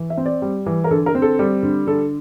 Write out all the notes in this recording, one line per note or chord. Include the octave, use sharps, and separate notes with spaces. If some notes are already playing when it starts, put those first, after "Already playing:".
Already playing: E3
E5
C4
D5
G3
E3
A#4
D3 A4
A#4
C4
A4
G3
D3
D3 A4